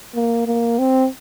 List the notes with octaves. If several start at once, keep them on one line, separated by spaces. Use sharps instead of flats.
A#3
A#3
C4